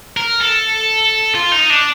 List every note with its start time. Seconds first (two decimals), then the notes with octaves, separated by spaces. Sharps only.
0.17 A#4
0.41 A4
1.35 F4
1.52 D#4
1.70 D4